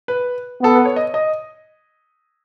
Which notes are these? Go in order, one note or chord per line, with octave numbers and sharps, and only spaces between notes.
B4
B3 A4
B4
C#5
D#5
D#5